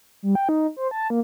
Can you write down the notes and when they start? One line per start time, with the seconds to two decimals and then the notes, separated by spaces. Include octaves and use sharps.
0.23 G3
0.35 G5
0.49 D#4
0.77 C5
0.91 A5
1.10 A#3